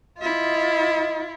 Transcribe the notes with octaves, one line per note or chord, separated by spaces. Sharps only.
E4 F4 D#5